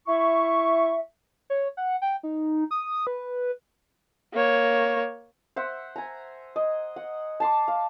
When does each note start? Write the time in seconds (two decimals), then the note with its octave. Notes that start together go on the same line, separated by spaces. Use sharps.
0.07 E4 E5 C#6
1.50 C#5
1.77 F#5
2.02 G5
2.23 D#4
2.71 D#6
3.07 B4
4.33 A#3 C#5
5.56 C5 E5 F#5
5.96 G#5 A#5
6.56 D#5
6.96 F#5
7.40 A5 C6 D6
7.68 F5